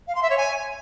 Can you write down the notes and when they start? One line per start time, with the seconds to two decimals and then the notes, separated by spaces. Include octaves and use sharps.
0.07 F5
0.14 C6
0.22 E5
0.29 C#5
0.37 G#5